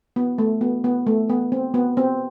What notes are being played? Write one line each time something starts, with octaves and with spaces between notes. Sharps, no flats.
B3
A3
B3
B3
A3
B3
C4
B3
C4